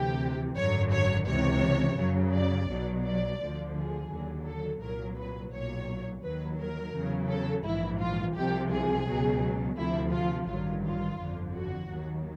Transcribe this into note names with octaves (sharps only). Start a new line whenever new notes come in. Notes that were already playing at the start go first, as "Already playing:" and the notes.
Already playing: D2 C3 E3 G4
G#1 F#2 D3 F#3 C#5
C#5
C#2 C3 E3 C#5
F#2 C#3 F#3
D5
B1 B2 F#3
D5
D2 D3 F3
G#4
D#2 D3 F#3
A4
C2 A#2 F#3 A#4
B4
B1 A#2 F#3 C#5
D#2 D#3 F#3 B4
A#4
E2 C#3 F#3
A4
A#1 G#2 E3 E4
F4
C2 C3 F3 G4
G#4
C#2 B2 F#3
D2 C3 F3 E4
F4
A1 G2 D#3 F#3 F4
F4
G1 F2 D3 F3
F#4
D#2 D#3 F#3